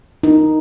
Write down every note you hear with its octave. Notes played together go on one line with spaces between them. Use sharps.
D#4